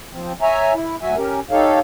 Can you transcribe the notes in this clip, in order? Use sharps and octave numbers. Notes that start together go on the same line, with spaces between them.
F3 C4
C#5 E5 G#5 A#5
E4
D2 F#3 F#4 E5 G#5
C#4 G4 A#4
D#4 G4 A4 C#5 F5